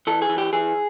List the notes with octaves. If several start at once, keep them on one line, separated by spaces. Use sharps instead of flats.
E3 A4
G#4
E3
G4
E3 G#4